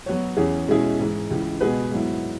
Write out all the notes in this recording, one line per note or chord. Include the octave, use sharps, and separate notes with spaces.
F#3 B3 F#4 C#5
E2 E3 C#4 G#4
B2 G#3 C#4 E4 G#4
G#2 E3 G#3
C#2 C#3 E3
B2 G#3 B3 G#4 B4
G#2 F#3 B3 E4